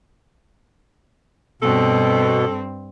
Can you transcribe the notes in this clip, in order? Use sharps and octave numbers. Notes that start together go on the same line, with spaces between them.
G2 B2 C4 A4